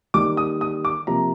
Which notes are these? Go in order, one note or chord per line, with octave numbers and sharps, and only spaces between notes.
D#3 G3 A#3 D6
D#6
D#6
D6
C3 F3 A#3 A#5